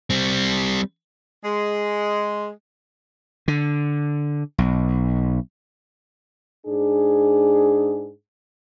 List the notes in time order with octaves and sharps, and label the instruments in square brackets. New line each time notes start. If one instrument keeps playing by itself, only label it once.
[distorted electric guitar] G3 C4
[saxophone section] G#3
[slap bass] D3
B1
[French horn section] G#2 D4 G#4